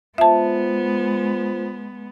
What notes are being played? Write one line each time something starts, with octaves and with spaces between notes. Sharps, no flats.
G#3 B3 F4 C5 E5 A5